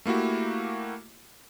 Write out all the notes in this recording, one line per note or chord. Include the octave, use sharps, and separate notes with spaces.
A3 A#3 E4 F#4 G4